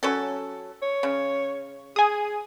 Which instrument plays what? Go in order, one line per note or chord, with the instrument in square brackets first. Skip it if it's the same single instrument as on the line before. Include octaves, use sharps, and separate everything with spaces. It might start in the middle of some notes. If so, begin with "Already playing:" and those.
[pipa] F#3 C#4 A4
[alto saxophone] C#5
[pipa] C#3
[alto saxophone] G#4 [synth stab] G#5 D#6